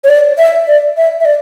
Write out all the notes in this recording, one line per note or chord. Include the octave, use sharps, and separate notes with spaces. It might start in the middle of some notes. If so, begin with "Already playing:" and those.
C#5
D5
E5
D5
E5
E5
D5